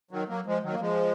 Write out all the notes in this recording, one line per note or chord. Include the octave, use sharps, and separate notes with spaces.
D#3 F#3
F#3 A#3
F3 G#3
D#3 F#3
A#3
F3 G#3